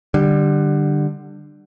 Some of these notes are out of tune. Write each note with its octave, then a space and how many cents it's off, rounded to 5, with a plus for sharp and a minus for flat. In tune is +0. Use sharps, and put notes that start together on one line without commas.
D3 +20 G3 +0